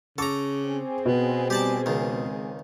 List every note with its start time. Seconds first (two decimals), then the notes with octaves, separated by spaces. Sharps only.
0.18 C#3 A4 A#5 C#6 D6
0.64 C4 G#4
1.05 B2 B3
1.50 G3 G4 D5 A5
1.86 C#2 D#3 G#3